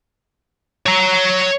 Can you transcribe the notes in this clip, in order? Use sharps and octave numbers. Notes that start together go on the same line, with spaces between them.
C#5 A#5